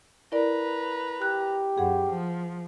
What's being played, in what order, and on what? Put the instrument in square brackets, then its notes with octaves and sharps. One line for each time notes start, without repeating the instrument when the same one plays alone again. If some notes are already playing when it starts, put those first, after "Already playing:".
[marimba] E4 A#4 D5 [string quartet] B4 A#5
[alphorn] G4 [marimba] F#6
[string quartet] F#2 [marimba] G#4 F#5
[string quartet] F3